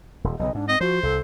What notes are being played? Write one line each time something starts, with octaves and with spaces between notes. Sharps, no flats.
D#1
B1 G2 C#3 D#5
G#2 D4
C4 D#5
F3 F#4 C5
C2 A4